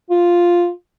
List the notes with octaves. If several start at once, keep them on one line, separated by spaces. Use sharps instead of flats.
F4